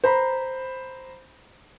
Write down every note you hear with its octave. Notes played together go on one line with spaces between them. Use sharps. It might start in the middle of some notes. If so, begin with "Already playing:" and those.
C5 A#5 B5